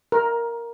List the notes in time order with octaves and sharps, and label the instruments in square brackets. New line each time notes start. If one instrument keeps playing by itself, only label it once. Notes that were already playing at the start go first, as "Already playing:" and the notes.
[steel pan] A#4